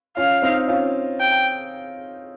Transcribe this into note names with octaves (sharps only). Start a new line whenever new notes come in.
C#4 F4 F5
C4 D#4
C#4 F4
G5